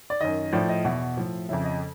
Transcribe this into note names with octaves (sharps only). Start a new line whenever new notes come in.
D5
F#2 D#3 D#5
A2 F3 D5
D#5
E2 B2 E5
A2 F3
F2 C#3 F3 E5
D#5